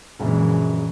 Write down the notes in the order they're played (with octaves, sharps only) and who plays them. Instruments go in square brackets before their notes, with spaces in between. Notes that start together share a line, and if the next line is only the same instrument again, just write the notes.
[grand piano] A#1 F#2 C#3 [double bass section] A#2 E3 G#3